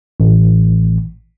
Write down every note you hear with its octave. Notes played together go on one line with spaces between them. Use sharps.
A1